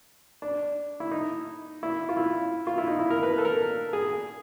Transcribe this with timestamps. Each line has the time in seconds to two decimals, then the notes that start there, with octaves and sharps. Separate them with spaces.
0.42 D4
1.00 E4
1.11 D#4
1.83 E4
2.09 F4
2.17 E4
2.67 F4
2.78 E4
2.88 D#4
2.99 E4
3.10 A#4
3.23 B4
3.30 A#4
3.38 A4
3.45 A#4
3.93 G#4